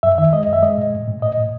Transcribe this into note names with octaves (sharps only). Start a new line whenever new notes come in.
F#2 E5
D#3 E5
G#3 D#5
F#2 E5
G#3 D#5
A2
A2
A2
A2 D#5
A2